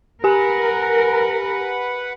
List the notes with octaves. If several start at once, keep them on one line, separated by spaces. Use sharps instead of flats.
G4 A#4 B4 F#5 G#5